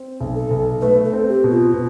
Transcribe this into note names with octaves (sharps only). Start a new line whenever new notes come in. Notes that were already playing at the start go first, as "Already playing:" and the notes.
Already playing: C4
B1
A4
B1
A3 B4
A4
C4
G4
B2
F4
B2